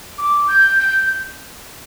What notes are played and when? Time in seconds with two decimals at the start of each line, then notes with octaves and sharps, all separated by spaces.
0.18 D6
0.48 G6
0.79 G6